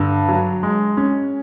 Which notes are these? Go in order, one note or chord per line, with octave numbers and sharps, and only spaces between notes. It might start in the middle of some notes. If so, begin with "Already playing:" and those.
Already playing: G2 D3
F#3
G#3
C#4